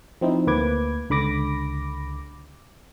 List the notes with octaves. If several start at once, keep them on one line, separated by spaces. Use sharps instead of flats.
F3 C4 D#4 E4
D2 A#3 B4 D6 G#6
C#2 D3 B5 D6 A#6